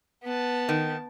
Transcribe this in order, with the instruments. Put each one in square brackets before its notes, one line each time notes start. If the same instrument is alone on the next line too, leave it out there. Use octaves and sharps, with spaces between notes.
[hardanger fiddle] B3 A5
[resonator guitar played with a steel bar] D#3